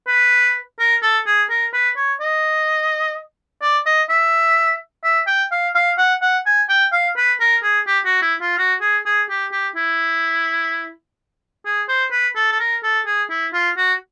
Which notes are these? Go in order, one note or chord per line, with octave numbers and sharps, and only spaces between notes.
B4
A#4
A4
G#4
A#4
B4
C#5
D#5
D5
D#5
E5
E5
G5
F5
F5
F#5
F#5
G#5
G5
F5
B4
A#4
G#4
G4
F#4
E4
F4
F#4
G#4
G#4
G4
G4
E4
G#4
C5
B4
A4
A4
A#4
A4
G#4
E4
F4
F#4